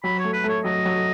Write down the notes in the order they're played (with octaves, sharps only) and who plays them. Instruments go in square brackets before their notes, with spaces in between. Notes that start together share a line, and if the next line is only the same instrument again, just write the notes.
[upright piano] F#3 [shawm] B5
[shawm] C#5
[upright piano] A3
[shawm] B4
[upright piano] A3 [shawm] C#5
[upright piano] F#3 [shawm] D#5
[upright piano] F#3